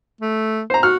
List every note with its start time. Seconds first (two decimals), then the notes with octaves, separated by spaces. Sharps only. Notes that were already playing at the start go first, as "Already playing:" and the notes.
0.21 A3
0.70 C5 A#5
0.83 F#4 F6